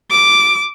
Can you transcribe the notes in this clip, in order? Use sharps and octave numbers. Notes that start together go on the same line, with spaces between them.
D6